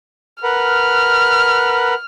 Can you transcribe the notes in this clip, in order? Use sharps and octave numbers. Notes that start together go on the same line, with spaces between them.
A#4 B4 F#5 F6